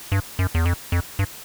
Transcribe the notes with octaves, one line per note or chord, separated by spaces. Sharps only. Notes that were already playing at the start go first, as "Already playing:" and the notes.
G2
F#2
E2
F2
F2
G2